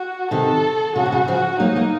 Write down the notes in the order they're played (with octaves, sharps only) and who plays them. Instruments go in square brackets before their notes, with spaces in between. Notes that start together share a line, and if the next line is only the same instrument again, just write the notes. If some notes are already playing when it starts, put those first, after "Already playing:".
Already playing: [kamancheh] F#4
[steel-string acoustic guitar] C3 D#3 [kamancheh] A4
[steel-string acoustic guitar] C#3 [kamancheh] F#4
[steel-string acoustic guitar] C3
C#3
[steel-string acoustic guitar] C#3 F3 [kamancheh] F#4
[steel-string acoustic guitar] F#3 A#3 [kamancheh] D#4
[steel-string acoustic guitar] F#3 A#3